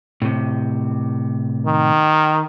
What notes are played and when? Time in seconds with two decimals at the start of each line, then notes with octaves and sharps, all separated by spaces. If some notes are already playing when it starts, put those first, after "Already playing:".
0.22 A2 C3
1.66 D#3